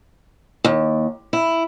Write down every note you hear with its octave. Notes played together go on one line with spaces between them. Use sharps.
D#2
E4